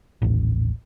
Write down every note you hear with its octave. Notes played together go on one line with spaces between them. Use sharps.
D#1 A1